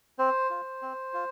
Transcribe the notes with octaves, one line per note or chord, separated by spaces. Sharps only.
C4 C5
F4
C4
F4